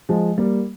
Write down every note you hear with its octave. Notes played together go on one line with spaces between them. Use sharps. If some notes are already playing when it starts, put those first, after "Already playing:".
F3 G#3
G3 A#3